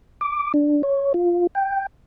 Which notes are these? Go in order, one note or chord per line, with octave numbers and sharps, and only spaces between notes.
D6
D4
C#5
F4
G5